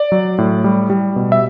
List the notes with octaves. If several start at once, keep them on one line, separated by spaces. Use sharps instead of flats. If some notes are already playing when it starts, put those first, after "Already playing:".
Already playing: D5
F#3
A2
G3
G3
B2
E5